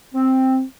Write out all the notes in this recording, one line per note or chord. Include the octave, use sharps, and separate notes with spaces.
C4